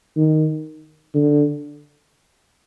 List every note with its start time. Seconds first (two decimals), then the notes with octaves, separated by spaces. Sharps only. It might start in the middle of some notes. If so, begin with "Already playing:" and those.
0.16 D#3
1.15 D3